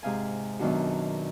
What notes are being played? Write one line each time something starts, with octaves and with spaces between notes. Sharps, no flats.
G#2 C3 F5 G#5
F#2 B2 D#3 D4 F#4